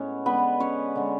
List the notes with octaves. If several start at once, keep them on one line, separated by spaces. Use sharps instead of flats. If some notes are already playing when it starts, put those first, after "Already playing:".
Already playing: A2 G#3 B3 C#4 C#5
D3 G#3 B3 B4
C#4 C#5
D3 G#3